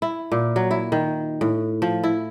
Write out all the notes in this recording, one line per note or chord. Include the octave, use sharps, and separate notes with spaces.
E4
A#2
F#3
E4
D#3
A2
F3
E4